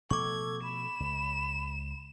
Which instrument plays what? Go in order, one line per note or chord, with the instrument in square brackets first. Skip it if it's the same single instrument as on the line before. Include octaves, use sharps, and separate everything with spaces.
[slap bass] B2 F3 A3 [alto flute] A4 [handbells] C#6 D6 [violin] G#6
[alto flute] B5 [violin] E7
[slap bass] C#2